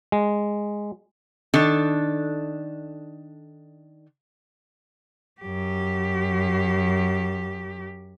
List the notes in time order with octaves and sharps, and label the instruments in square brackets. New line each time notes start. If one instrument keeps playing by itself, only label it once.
[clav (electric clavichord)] G#3
[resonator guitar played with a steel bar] D#3 D4 A4
[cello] F#2 G4